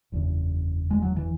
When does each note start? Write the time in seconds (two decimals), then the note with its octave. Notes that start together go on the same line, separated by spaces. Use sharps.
0.12 F#1 E2 C#3
0.91 G#3
1.02 F#3
1.16 E3